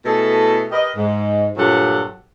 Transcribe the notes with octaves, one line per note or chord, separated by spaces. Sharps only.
B2 A3 E4 G#4 A4
G4 A#4 B4 D#5
G#2
G2 A#2 F#3 G4 A4 F#5